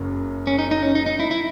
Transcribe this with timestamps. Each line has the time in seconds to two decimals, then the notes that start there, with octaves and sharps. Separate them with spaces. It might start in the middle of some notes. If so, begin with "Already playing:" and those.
Already playing: F#1 F#2 C#3 F#3
0.47 C#4
0.59 D#4
0.71 D#4
0.83 C#4
0.95 D#4
1.06 D#4
1.20 E4
1.31 E4